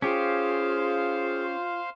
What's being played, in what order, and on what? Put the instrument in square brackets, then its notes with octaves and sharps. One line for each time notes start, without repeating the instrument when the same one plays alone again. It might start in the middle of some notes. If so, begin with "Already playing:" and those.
[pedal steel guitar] C#4 G4 [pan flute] F4 [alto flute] G#4 [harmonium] C5 F5